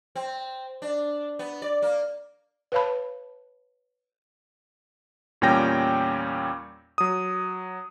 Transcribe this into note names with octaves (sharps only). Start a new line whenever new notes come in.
C4
D4
B3
D5
A#3
B4 C#5 F5 A5 B5
E2 A#2 G3 C#4 G5 A#6
F#3 D#6